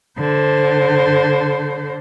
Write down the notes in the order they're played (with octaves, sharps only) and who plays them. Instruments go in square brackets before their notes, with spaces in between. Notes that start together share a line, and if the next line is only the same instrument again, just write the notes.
[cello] D3 C5